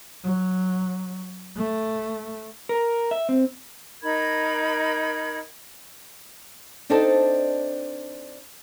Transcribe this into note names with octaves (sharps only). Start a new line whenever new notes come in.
F#3
A3
A#4
E5
C4
D#4 A#4 B5 G#6
C4 D4 D#4 A4 C5 D5